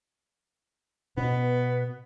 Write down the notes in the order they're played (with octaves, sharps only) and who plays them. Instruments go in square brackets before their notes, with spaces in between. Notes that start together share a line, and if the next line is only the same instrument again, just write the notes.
[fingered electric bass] B2 [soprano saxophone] B3